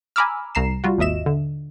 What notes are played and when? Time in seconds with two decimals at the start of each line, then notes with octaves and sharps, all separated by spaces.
0.16 G#5 A#5 B5 D6 E6 F6
0.55 C2 A#5 C7 E7
0.84 G3 F4 F#4
0.98 G#1 D#2 D#5 E5 E7
1.26 D3